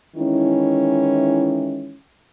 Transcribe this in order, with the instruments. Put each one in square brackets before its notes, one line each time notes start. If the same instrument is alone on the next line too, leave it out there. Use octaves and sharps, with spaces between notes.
[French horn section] D#3 E3 G#3 C#4 E4